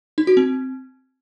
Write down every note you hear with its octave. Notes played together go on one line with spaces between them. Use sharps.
D#4
F#4
C4